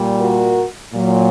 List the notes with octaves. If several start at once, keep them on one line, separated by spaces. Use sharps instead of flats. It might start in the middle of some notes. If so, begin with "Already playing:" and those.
Already playing: A#2 G3
F#4 A#4
A#2 F#3